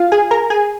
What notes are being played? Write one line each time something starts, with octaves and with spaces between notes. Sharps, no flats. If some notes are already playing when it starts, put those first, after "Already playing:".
Already playing: F4 F5
G#4 G#5
A#4 A#5
G#4 G#5